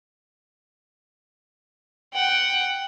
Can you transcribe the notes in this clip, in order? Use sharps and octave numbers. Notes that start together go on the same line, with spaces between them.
F#5 G5